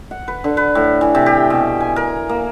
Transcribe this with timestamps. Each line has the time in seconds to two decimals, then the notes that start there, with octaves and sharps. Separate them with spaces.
0.11 F#5
0.28 B4
0.44 D3
0.57 B4
0.75 A2
1.01 E3
1.15 C3
1.26 G4
1.50 B2
1.80 G#5
1.96 A#4
2.29 A#3